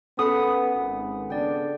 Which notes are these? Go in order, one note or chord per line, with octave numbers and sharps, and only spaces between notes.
B3 C#4 A4 F#5 B5 D#6
G#1
C#3 B3 D4 D5 G5